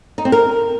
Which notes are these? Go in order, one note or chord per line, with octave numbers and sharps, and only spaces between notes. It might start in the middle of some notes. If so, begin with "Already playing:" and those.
D#4
C4
A#4